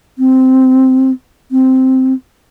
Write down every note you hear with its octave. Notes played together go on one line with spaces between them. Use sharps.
C4
C4